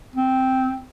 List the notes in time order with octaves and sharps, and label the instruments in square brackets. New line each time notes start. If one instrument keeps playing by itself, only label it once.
[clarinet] C4